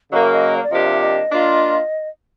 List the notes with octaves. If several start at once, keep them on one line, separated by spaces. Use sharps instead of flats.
C#3 F#3 A#3 D#5
E5
D#5
C#5
D5
C3 F3 A#3 D4 G4 D#5
E5
D#5
A#3 D4 F4